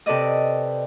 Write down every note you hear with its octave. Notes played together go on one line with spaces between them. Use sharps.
C3 A4 B4 D5 D#5